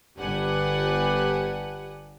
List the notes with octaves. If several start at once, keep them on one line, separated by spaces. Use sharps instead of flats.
G1 D4 G4 B4 F#5 G#5